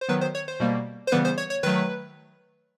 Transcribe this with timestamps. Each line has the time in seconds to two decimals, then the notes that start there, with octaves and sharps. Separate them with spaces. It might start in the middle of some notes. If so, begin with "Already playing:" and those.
0.01 C5
0.08 D#3 F#3 B3 B4
0.21 C5
0.35 C#5
0.48 C5
0.60 B2 G3 A#3
1.07 C5
1.12 C#3 E3 G3 B3 B4
1.25 C5
1.38 C#5
1.50 C#5
1.63 D#3 F#3 A3 B4